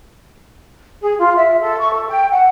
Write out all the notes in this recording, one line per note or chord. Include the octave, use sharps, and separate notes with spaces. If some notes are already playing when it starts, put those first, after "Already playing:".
G#4
F4
E5
A4
C#6
A4
G5
F#5